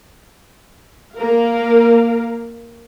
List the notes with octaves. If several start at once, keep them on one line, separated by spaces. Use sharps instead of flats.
A#3 A#4 F5